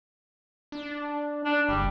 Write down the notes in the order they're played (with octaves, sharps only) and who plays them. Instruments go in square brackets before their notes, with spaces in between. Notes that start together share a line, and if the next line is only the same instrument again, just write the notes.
[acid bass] D4
[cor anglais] D4
[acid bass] F#1 [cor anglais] G3